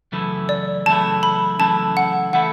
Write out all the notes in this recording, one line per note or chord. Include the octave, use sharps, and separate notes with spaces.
F#2 C#3 E3 A3 E4
D5
F#2 C#3 E3 A3 E4 A5
B5
F#2 C#3 E3 A3 E4 A5
F#5
C#3 E3 A3 E4 F#5